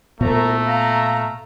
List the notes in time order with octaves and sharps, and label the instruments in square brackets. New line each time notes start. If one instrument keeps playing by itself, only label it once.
[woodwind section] C2 A#5 [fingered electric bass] A#2 B3 [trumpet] A3
[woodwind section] F5 A#5